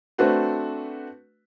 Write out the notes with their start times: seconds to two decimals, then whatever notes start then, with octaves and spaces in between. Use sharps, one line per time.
0.18 A3 C4 D4 F#4 B4